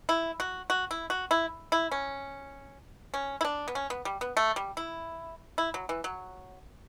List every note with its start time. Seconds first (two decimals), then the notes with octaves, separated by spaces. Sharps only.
0.09 E4
0.40 F#4
0.70 F#4
0.91 E4
1.10 F#4
1.31 E4
1.72 E4
1.92 C#4
3.14 C#4
3.41 E4
3.45 D4
3.68 B3
3.75 C#4
3.90 B3
4.05 G3
4.21 B3
4.37 A3
4.56 G3
4.77 E4
5.58 E4
5.74 F#3
5.89 E3
6.04 F#3